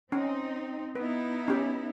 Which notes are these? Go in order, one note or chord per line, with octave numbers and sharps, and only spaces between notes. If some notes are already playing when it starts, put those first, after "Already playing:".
C4 C#4 D#4
B3 D#4 E4 B4
C#4 G4